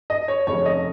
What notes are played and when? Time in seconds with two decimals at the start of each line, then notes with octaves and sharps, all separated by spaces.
0.10 D#5
0.28 C#5
0.47 F1 F2 C#3 C#5
0.66 D#5